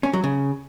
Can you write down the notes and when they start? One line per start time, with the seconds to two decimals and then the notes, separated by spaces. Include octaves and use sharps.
0.03 C#4
0.13 F#3
0.24 C#3